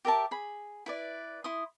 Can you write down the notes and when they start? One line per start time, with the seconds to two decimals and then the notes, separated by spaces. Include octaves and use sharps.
0.05 G4 A#4 E5 A5
0.31 G#4 B5
0.86 E4 B4 D5
1.44 E4 C6 D#6